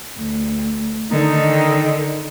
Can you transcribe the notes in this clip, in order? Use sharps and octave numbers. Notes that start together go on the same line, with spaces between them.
D2
D3 D#3 D#4